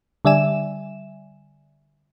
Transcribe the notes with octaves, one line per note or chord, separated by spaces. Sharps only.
D3 G3 D5 E5 G#5 E7